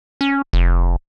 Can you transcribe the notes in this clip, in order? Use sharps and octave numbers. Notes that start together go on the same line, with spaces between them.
C#4
F1